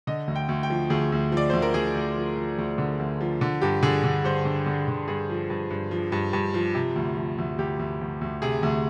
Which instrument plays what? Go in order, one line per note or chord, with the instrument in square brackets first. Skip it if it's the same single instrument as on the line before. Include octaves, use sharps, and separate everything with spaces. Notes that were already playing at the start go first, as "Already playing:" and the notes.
[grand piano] D3 D#5
D2
G5
D2
G5
F3
D2 G#4
D2
F3 D5
D2 C5
A#4
D2 G#4
D2
F3
F3
D2
D3
D2
F3
D3
G2 G4
D3 G#4
D3
G2 C5
D3
D3
D3
G2 G#4
F3
G2
G2
F3
G2
G2
F3
C3
D2
F3
D2
D2 G4
D2
D2
D2
C3 G#4
D2